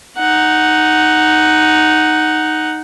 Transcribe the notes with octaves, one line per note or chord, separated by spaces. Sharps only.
D#4 F#5